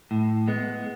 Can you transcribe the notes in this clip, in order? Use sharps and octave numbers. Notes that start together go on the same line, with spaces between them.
A2
G#3 B3